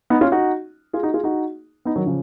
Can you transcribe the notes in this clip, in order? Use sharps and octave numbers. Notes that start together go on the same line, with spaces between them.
B3 D#4
C#4 F4
D#4 F#4
F4 G#4
D#4 F#4
F4 G#4
D#4 F#4
B3 D#4
D#3 F#3
C#3 F3